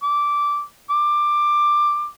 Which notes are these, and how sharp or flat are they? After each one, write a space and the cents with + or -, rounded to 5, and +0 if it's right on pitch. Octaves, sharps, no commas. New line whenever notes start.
D6 -10
D6 +15